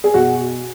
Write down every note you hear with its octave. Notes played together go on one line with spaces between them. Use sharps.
G#4
B2 F#4